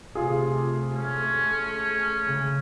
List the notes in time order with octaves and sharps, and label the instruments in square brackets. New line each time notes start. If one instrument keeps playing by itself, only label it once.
[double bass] C3 A3 [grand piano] F4 G#4
[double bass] A3 [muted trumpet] C#4
[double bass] C#3